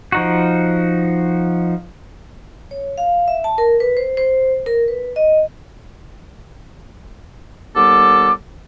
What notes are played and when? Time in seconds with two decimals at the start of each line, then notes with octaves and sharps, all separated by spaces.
0.12 F3 D#4 F#4
2.71 C#5
2.98 F5
3.28 E5
3.44 A5
3.58 A#4
3.80 B4
3.97 C5
4.17 C5
4.66 A#4
4.88 B4
5.16 D#5
7.76 D#2 G3 B3 A4 D6